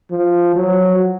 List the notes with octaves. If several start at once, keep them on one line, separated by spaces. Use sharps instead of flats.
F3
F#3